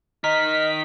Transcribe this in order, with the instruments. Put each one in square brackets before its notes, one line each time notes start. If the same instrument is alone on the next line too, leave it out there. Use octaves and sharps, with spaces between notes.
[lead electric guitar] D#4 A#4 [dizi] D#5 [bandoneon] F6 [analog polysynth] B6